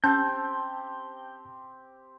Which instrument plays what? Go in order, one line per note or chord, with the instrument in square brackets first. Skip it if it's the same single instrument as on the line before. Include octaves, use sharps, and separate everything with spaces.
[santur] C4 G4 [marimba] C#4 [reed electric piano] A5 [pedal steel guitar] G6